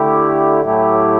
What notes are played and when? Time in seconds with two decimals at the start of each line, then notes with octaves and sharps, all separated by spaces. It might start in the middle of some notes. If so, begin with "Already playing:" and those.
Already playing: D3 A3 E4 G4
0.63 A2 F#3 A3 E4 G4